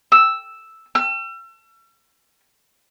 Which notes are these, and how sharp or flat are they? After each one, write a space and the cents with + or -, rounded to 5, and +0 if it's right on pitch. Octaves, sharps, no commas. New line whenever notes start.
E6 +0
E6 +40